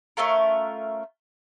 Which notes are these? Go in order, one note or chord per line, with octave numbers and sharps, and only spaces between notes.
A3 C#4 F4 A#4